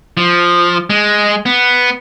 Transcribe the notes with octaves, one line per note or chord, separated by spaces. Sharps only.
F3
G#3
B3